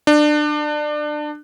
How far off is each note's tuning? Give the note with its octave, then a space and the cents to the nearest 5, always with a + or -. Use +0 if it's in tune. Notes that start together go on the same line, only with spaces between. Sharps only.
D4 +25